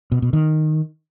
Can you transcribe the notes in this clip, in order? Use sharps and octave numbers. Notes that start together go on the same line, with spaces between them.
B2
B2
D#3